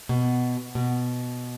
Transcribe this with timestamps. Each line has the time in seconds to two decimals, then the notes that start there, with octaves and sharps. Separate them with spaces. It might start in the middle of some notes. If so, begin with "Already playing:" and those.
0.09 B2
0.75 B2